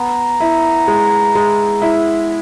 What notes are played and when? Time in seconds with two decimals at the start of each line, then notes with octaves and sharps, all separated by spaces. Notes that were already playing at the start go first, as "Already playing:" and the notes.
Already playing: B3 A#5
0.40 E4
0.87 G#3
1.35 G#3
1.82 E4